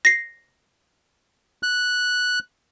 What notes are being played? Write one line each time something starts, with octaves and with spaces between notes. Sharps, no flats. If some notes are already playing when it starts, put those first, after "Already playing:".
A#6 C7
F#6